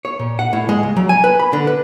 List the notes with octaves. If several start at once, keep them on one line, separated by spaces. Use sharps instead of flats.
C#5
A#2
F#5
A2
G#3
C#2
F#3
G#5
B4
B5
D3
B4